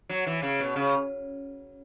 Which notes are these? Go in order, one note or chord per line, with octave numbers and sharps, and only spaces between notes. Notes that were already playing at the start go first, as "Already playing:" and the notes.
F#3
E3
C#3
B2
C#3